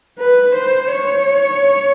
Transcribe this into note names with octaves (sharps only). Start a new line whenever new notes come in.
B4
C5
C#5